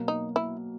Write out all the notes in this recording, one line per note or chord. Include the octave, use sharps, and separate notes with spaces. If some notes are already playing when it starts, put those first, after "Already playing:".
Already playing: B2 F#3 A#3
D#4
E4